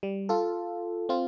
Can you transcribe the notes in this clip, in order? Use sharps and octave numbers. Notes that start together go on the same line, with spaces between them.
G3
F4 A4
C4 F4